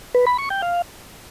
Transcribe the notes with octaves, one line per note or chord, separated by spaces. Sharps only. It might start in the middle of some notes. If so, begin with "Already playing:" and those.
B4
B5
C#6
G5
F5